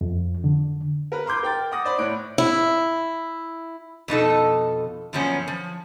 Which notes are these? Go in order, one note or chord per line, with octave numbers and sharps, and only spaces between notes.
F2
D3
A#4 B4
A#5 C6 D6 G6
A#4 G5 A6
F#5 D6 D#6 A#6
C5 D5 B5
A2 C#5 F#6 D7
E4
F2 B2 D#4 A4
F#2 A#2 F3 B3 C#4 F#5
F3